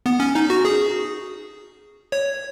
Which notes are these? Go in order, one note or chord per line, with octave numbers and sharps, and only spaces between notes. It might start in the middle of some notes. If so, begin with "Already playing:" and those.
B3
C#4
D#4
F#4
G#4
C#5